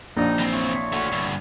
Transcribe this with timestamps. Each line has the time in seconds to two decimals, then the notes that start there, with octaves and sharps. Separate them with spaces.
0.17 A#1 F3 G3 D#4
0.39 E3 C4
0.52 E4 F4 C#5
0.92 A3 F#4
1.12 G2 D3